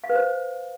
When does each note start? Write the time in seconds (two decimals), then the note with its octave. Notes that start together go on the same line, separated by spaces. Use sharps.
0.04 F5
0.09 B4
0.15 C5